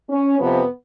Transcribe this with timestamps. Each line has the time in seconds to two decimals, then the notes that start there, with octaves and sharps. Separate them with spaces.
0.09 C#4
0.39 F2 C3 F3 B3